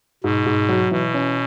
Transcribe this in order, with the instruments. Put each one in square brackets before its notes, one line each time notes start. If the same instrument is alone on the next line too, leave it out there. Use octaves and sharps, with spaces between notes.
[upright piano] G#2 [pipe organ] B2
[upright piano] G#2
F#3
[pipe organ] B2 [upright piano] E3
[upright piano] C#4